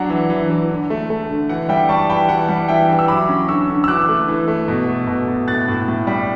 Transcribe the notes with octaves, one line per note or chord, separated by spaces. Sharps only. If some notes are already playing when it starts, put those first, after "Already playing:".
Already playing: F#3 D4 F#5
E3
E3
E3
D3
A3
A3
D3
E3 F#5
G3 E5 G5
G3 A5 C#6
E3 G5 B5
E3 F#5 A5
G3
E3 E5 G5
E3
E6
F#3 B5 D6
C#4
D3 C#6 E6
D3
E6
E3 D6 F#6
A3
E3
A3
B2
A3
B2
B2
A2 F#6 A6
A2
A2
G3